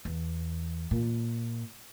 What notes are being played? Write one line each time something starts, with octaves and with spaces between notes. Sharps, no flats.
E2
A#2